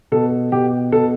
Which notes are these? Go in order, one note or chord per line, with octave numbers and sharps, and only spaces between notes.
B2 A4
B2 G4
B2 A4